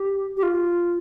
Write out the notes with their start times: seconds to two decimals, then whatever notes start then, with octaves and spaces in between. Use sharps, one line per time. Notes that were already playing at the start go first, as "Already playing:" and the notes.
Already playing: G4
0.37 G4
0.43 F4